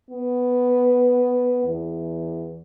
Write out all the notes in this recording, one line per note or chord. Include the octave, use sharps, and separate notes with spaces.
B3
E2